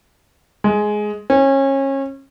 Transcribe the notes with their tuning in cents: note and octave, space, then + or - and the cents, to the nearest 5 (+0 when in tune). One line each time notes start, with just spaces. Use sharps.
G#3 +10
C#4 -30